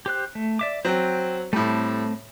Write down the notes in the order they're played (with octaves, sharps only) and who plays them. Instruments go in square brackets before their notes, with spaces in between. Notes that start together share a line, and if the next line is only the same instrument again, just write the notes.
[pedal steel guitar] G4 C5 F#6
A3
D5 E5 D6
[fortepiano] F#3 C4 [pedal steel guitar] C5 G5
[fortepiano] A2 G3 [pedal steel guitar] A3 C4